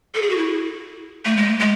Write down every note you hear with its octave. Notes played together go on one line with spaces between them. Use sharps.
A4
G#4
F#4
E4
A3
G#3
G#3